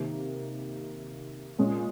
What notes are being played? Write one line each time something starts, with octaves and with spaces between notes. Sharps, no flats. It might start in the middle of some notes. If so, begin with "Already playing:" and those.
Already playing: C3 D#3 A#3 D#4 G4
A#2 G#3 C#4 F4